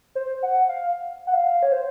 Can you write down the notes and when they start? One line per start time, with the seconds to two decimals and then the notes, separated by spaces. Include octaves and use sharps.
0.15 C5
0.43 F#5
0.69 F5
1.27 F#5
1.33 F5
1.63 C#5
1.72 C5